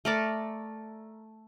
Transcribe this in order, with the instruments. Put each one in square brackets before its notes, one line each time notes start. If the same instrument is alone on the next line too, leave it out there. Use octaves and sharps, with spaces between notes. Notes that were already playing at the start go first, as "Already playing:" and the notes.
[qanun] A3 A#4 D5